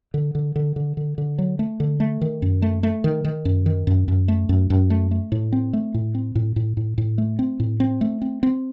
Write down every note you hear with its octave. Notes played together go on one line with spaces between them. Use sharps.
D3
D3
D3
D3
D3
D3
F#3
A3
D3
A3
D#3
F#2
A3
A3
D#3
D#3
F#2
D#3
F#2
F#2
A3
F#2
F#2
A3
A3
A2
C4
A3
A2
C4
A2
A2
A2
A2
A3
C4
A2
C4
A3
C4
C4